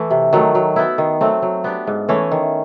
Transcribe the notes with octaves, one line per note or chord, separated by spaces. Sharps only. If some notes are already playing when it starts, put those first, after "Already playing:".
Already playing: E3 A3
C3
D#3 F#3 A3
F#3
B3 E4
D#3
F#3 A3 C4
F#3
B3 D4 G4
G#2
E3 A3 C#4
D#3